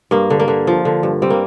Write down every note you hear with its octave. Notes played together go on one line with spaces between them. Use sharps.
G2 A#3
D3
A#3
D3
F3
D3
G2
G3 C4
A#3